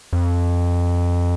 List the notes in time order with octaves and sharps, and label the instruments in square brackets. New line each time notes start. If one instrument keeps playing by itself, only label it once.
[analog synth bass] F2